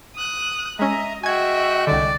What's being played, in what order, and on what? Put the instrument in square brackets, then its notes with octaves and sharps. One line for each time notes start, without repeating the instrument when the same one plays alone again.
[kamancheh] D#6 F#6
[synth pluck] G#3 C#4 [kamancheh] D#5 [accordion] E5 A#5
[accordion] G#3 [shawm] F#4 [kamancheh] E5 G5 [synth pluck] G#5 G#6
[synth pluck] C2 D3 [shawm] D5